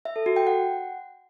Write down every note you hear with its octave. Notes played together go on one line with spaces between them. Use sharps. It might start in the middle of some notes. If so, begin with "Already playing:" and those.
E5
A4
F#4
G5
F#5